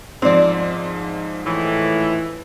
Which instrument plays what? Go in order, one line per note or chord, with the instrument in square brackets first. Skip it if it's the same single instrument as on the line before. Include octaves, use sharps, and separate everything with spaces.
[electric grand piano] G#2 F3 [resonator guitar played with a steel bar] C4 D5
[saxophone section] A2 E3